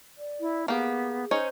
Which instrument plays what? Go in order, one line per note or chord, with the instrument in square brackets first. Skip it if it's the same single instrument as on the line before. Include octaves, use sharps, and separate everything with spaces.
[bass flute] D5
[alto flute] E4
[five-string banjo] A#3 G4 [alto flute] B3 [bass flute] G#4
[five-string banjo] C#4 D#4 C#5 [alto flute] C5